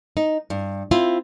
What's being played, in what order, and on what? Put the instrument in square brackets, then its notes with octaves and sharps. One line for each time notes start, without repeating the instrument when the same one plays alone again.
[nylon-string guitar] D#4
G2
C4 E4 F4